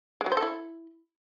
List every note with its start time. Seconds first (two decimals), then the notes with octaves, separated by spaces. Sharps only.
0.21 G#3
0.26 F#3
0.32 C5
0.37 A4
0.42 E4